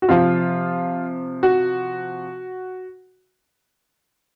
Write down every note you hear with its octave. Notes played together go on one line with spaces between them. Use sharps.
F#4
C3 F3 F4
F#4